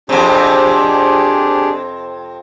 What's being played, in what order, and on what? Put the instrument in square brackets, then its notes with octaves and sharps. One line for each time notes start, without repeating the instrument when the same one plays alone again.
[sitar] F2 C3 [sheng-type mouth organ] D4 G4 G#4